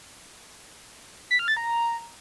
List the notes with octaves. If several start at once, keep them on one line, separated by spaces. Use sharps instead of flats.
B6
F6
A6
A#5